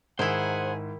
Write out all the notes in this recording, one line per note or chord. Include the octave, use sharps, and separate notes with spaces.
G#2 D#3 E4 G#4 C5 F#5 G#5